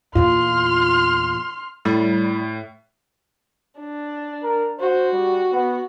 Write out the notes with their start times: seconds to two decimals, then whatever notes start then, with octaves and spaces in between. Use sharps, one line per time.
0.15 E2 A#2 F4 C6 F6
1.85 A2 G3
3.79 D4
4.43 A#4
4.79 F#4 C5
5.13 G3
5.52 B3